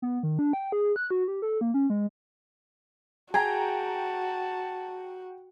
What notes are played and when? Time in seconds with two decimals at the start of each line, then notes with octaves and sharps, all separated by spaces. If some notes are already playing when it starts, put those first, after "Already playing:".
0.02 B3
0.23 D#3
0.39 D4
0.53 G5
0.72 G#4
0.96 F#6
1.11 F#4
1.28 G4
1.42 A4
1.61 A#3
1.74 C#4
1.90 G#3
3.34 F#4 G#4 G5 A5 A#5